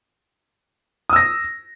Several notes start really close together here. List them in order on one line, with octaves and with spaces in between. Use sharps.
D#6 E6 A#6